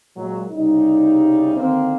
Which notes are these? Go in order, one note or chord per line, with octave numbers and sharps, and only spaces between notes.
A#2 F#3 G#3
C2 C#3 G3 D#4
D3 D#3 A#3 C4